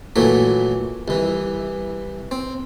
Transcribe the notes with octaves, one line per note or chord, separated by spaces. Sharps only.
A#2 E3 F#3 A3
C2 E3
C4